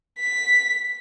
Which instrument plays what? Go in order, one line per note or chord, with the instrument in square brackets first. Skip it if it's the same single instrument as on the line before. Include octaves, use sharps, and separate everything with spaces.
[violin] B6